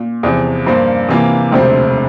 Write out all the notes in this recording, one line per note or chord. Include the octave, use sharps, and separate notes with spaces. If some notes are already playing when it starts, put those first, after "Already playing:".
Already playing: A#2
E2 C3 F3
G2 F3 A#3 F4 C5
C3 E3 A#3 F4
E1 D2 C3 F3 C4